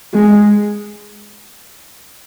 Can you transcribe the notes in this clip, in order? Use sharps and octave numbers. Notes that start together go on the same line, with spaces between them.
G#3